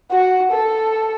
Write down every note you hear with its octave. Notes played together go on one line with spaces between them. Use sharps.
F#4
A4